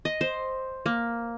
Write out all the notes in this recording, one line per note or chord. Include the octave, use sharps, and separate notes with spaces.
D#5
C5
A#3